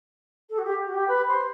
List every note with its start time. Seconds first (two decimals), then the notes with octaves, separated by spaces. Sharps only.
0.49 A4
0.58 F#4
0.64 G4
0.85 F#4
0.93 G4
1.07 B4
1.27 C5